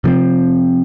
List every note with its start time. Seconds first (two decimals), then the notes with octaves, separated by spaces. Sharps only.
0.04 C3 F3 C4